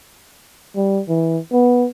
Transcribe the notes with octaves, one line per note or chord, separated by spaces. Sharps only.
G3
E3
B3